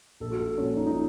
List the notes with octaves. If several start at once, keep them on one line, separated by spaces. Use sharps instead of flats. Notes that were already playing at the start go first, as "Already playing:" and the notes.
A#1 A4
F#4
A4
A#2 F3 C#4
D#4
D#4